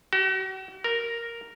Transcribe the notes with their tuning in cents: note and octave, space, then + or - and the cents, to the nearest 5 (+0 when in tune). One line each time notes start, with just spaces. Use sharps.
F#4 +45
A#4 +0